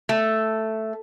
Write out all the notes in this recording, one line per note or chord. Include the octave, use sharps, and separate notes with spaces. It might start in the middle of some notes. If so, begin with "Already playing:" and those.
A3